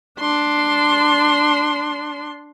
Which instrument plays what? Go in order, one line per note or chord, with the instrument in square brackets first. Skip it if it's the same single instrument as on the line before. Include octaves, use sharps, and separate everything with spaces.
[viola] D4 C6